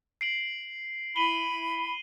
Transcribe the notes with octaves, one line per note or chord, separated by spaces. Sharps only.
C7 D7 F#7
E4 B5 D#7 F#7 G7